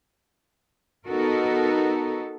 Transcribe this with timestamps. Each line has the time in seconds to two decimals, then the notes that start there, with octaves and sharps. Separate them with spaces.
1.07 B3 D#4 F#4 A4 A#4